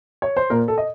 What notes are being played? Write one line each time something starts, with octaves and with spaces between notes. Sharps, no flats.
C#5
C5
A#2 A#4
A4
D#5